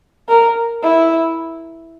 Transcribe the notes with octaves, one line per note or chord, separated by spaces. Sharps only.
A#4
E4